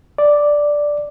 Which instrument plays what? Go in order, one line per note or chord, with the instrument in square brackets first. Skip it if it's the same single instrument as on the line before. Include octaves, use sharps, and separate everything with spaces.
[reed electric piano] D5